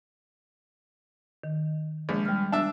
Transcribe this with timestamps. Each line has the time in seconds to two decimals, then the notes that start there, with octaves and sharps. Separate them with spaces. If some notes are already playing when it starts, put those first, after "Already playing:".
1.44 D#3
2.09 A#1 G#3
2.25 G3 F6
2.52 D4 E5